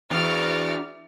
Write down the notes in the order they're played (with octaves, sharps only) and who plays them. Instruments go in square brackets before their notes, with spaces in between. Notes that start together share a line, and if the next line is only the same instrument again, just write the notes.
[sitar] E2 [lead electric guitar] D4 F#4 [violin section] F6 A6 D7